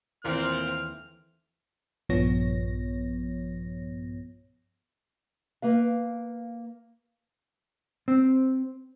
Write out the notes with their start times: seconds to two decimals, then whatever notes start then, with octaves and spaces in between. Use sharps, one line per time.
0.24 D#2 A#2 E3 A3 C4 F6
2.09 A#1 G2 F3 B3 C#5 A#6
5.62 A#3 B4 F5
8.08 C4